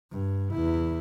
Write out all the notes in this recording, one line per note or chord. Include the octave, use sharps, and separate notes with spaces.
G2
E2 E4